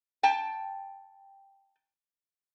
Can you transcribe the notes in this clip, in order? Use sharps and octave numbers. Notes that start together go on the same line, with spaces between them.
G5 A5